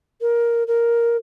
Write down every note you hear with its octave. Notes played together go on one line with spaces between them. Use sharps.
A#4
A#4